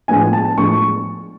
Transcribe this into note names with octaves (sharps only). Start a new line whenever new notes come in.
A2 F3 G#3 B3 D4 G#5
A5
A2 F3 G#3 B3 D4 C#6